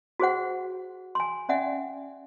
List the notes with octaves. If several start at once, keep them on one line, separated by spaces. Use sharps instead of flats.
F#4 G#4 C5 F#5
G#5 C6
C#4 D5 E5 F#5 G#5